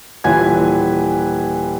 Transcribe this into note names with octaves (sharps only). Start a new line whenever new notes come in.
D#1 E3 F4 B4 G#5 G#6